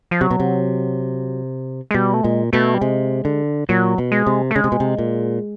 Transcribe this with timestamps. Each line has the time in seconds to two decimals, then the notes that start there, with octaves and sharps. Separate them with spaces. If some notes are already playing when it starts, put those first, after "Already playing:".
0.11 F3
0.21 C3 F#3
0.31 B2
0.40 C3
1.91 G#3
1.94 B2 G3
2.14 A3
2.23 A#2 G#3
2.53 B2 A3
2.74 G3
2.81 C3 G#3
3.25 D3
3.69 A#2 F#3
3.98 B2
4.12 G#3
4.27 C3
4.51 A3
4.55 C#3 G#3
4.64 C3
4.72 B2
4.80 C3
4.99 A#2